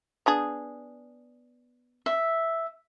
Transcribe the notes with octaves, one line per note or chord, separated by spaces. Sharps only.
B3 D4 G#4
E5